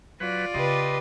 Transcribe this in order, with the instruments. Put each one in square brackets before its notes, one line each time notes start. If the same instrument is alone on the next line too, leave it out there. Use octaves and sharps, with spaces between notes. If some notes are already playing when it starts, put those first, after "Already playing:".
[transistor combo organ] F#3 B4 [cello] F4 D5
[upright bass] C#3 [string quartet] G4 B4 [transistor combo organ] D#5 C6